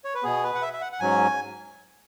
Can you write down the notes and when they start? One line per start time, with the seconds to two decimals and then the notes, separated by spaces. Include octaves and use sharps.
0.04 C#5
0.14 B4
0.23 B2 B3 G#4
0.44 B4
0.55 F#5
0.62 E5
0.73 E5
0.81 F#5
0.92 F#5
1.00 G#2 F#3 C#4 G#5